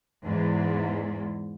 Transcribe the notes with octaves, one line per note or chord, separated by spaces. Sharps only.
E2 G#2